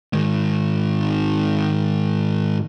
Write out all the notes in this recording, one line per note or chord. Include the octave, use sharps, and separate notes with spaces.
G#2 D#3